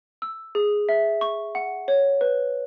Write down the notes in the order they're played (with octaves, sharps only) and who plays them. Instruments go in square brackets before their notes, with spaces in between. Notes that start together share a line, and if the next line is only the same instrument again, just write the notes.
[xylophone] E6
G#4
E5
C#6
F#5
C#5
B4